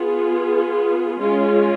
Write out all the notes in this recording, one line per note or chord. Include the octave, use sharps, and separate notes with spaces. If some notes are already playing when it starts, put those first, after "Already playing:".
Already playing: B3 F4 G#4
G#3 C#4 F4